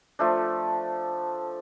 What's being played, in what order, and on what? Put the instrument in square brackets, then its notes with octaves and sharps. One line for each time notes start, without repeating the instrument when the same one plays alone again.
[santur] F3 A3 D4